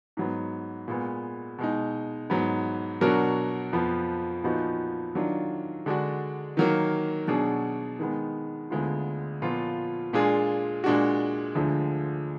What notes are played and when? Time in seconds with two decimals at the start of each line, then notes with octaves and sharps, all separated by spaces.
0.17 G#2 F#3 B3
0.88 A#2 G#3 B3
1.59 B2 G#3 D#4
2.30 G#2 F#3 B3
3.01 B2 F#3 D4 F#4 A#4
3.73 F2 F3 B3
4.43 A#2 F3 B3 D#4 F#4
5.15 D#3 F#3 D4 F4
5.86 D3 G#3 D4 F#4
6.57 D#3 F#3 A#3
7.28 B2 F#3 D4 G#4
7.99 D#3 G#3 B3
8.70 D2 D3 G#3 B3 F4
9.42 A#2 F3 B3 F4
10.13 A#2 G#3 D4 F4 G#4
10.84 A#2 G#3 D4 F#4
11.55 D2 D3 F3 G#3